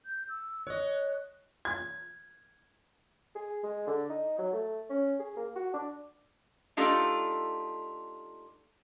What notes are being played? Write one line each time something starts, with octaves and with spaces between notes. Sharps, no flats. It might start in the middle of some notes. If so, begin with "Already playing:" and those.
G6
E6
C#5 D#5 F#6
G#6
G#4
G#3
D3
D#4
F#3
A3
C#4
G#4
A#3
F#4
D4
A3 D4 D#4 F4 G4 A4